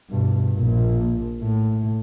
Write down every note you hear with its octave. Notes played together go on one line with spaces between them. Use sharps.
G2 B2
A#1 A#2
A2